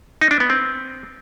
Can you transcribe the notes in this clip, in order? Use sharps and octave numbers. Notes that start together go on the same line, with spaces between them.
D#4
D4
B3
C4